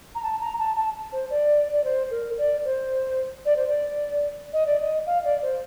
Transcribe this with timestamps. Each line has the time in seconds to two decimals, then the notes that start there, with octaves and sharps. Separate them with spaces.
0.15 A#5
0.23 A5
0.41 A#5
0.59 A5
0.77 A5
1.12 C5
1.30 D5
1.73 D5
1.84 C5
2.11 A#4
2.38 D5
2.65 C5
3.45 D5
3.56 C5
3.67 D5
4.53 D#5
4.67 D5
4.80 D#5
5.06 F5
5.25 D5
5.42 C5